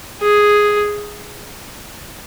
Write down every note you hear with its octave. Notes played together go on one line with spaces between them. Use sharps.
G#4